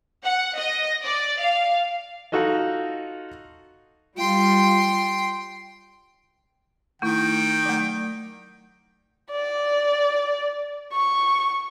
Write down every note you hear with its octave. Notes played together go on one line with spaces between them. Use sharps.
F#5
D#5
D5
F5
D#4 F4 F#4 A4 D#5
G3 F4 G5 C6
D#3 A3 E4 G5
F#3 A3
D5
C#6